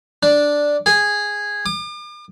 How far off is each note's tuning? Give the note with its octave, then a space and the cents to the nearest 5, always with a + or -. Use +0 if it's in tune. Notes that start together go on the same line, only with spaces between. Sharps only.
D4 +0
G#4 -10
D6 +45